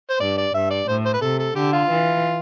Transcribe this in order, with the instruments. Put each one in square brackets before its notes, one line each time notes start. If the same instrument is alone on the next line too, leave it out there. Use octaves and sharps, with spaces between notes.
[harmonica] C5
[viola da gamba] G2 [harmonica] D5
[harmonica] D5
[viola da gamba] G2 [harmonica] E5
[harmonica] D5
[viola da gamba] A2 [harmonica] C5
[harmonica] C5
B4
[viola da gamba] C3 [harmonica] A4
[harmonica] A4
[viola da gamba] D3 [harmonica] G4
[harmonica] F4
[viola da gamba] E3